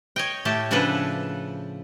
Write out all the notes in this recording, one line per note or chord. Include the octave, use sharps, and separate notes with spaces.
C#5 D#5 G5
A2 A3 G4 A5
C#3 F3 D4 A4 B4 F#5